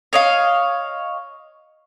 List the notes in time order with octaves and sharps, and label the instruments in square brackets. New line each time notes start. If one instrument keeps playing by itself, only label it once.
[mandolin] C#5 D#5 F5